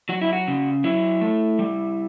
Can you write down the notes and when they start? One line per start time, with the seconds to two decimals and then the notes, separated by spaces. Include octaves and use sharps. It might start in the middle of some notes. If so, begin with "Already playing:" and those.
0.09 F#3 F#4
0.21 E4
0.33 F#4
0.48 C#3
0.84 F#3 E4
1.21 A3
1.59 G3